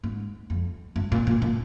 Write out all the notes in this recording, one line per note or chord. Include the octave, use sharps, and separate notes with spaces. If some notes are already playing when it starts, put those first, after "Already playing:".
G#2
F2
G2
A#2
A#2
A#2